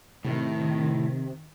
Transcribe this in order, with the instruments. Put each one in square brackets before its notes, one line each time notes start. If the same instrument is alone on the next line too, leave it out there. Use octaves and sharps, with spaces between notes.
[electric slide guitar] A2 [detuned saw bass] C3 [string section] D#3